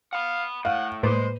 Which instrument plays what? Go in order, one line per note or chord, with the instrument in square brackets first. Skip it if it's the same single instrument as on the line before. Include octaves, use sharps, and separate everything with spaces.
[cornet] F5 [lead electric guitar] F#5 B5
[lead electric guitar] A2 [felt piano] F5 [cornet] F#5
[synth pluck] A2 A#3 D5 [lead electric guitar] G#3 [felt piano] B4 [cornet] C5